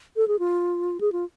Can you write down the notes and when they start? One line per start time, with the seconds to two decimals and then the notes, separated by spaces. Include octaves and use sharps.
0.16 A4
0.28 G#4
0.39 F4
1.01 G#4
1.12 F4